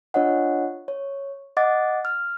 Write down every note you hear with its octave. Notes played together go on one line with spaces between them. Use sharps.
D4 F4 C#5 D#5 F#5
C#5
D#5 F#5 D6 A6
F6